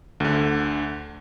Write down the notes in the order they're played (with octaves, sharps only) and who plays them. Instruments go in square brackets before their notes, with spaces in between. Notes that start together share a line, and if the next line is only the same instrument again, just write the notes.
[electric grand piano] D2 D3